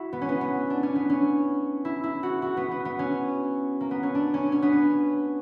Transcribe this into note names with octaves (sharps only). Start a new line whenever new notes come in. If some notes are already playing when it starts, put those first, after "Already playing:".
Already playing: E4 F#4
B3
C#4
B3
B3
D4
C#4
B3
C#4
E4
E4
F#4
F#4
B3
B3
B3
C#4
A#3
B3
C#4
D4
C#4
C#4
B3
C#4